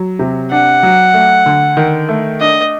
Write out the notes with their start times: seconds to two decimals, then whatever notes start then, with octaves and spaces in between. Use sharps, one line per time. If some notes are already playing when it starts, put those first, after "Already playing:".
Already playing: F#3
0.19 C3
0.51 D4 F#5
0.83 F#3
1.14 A3
1.46 D3
1.77 D#3
2.09 A3
2.40 D4 D#5